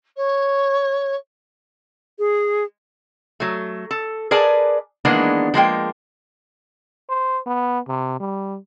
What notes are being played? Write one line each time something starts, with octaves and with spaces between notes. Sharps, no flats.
C#5
G#4
F#3 A3
A4
G#4 A#4 B4 D5 G#5 A5
D#3 E3 G#3 A#3 B3 D4
F3 G#3 A#3 G5
C5
B3
C3
G3